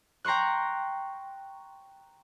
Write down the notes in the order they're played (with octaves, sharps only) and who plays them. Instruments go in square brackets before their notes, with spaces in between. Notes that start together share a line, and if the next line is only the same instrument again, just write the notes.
[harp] G5 A#5 C6 C#6 F#6